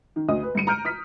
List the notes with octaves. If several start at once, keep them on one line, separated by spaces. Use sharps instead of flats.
D#3
D2 D#5 D#6
B4
G2 D3 C#7 D#7
A#5 F6 G6 D7
D#6 F6 B6